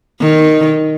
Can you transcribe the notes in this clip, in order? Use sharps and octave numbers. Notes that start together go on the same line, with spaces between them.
D#3